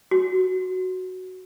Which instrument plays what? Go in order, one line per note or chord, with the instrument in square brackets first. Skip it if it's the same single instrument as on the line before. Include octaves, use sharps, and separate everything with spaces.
[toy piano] F#4